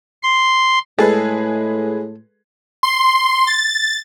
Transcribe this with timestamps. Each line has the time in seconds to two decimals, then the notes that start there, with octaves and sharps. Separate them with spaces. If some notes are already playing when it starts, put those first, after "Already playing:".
0.23 C6
0.99 A2 G#3 G#4 A4 B4
2.83 C6
3.47 A6